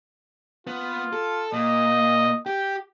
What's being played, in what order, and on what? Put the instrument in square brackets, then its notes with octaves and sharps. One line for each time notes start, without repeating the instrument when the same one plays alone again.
[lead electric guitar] B3 [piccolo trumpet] F4
[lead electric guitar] A4
[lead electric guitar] A#2 [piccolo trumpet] D#5
[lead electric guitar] G4 [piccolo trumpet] G5